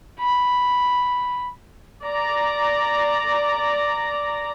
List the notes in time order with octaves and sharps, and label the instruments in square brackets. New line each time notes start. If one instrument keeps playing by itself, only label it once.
[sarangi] B5
[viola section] D5 A#5